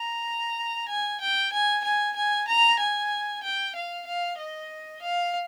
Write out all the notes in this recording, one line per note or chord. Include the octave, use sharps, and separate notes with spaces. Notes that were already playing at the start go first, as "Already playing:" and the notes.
Already playing: A#5
G#5
G5
G#5
G#5
G#5
A#5
G#5
G5
F5
F5
D#5
F5